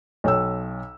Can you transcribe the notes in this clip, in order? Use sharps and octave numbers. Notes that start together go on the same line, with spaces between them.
B1 C#5 G5 E6